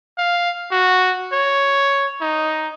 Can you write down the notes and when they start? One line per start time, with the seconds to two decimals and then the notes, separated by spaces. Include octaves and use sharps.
0.18 F5
0.71 F#4
1.33 C#5
2.21 D#4